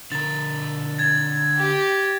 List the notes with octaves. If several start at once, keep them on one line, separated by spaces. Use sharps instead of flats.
D3 A#4 A6
G#6 A6
G4